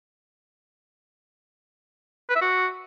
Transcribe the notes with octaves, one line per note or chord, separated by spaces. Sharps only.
B4
E5
F#4